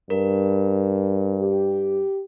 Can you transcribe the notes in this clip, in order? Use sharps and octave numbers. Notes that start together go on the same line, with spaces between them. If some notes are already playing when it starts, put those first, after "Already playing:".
G2 A#4
G4